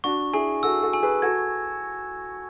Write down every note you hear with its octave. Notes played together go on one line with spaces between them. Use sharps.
D4 F#4 C#6
E4 G#4 G#5
F#4 A4 E6
F#4 A4
G#5
G#4 B4
F#4 A4 G#6